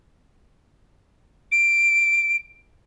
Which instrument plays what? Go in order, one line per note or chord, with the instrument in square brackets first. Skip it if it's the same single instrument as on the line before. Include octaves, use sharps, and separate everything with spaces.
[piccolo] D7